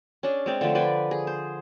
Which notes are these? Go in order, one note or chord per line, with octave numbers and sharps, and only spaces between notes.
C#4 D4 G#4
G#3 C4 D5
D3 F3 A3 C5
B4 D5 G5 G#5
G#4
C5